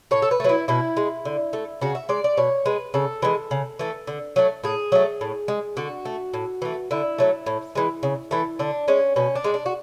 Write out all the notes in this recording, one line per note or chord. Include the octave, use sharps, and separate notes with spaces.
A2 C#5
A4
B4
A3
F#3 E4
B2 E4
G#3
D3
A3
C#3 F#4
E5
G#3 D5
D5
B2 C#5
G#3 B4
C#3 A4
E3 G#3
C#3
E3 A3
D3
F#3 A3
A2 G#4
F#3 A3
A2
G#3
D3 F#4
A3
A2
E3 A3
D3 E4
F#3 A3
A2
E3 G#3
C#3
E3 A3
D3 D4
G#3 C#4
B2 C#4
D4
G#3
D4
F#4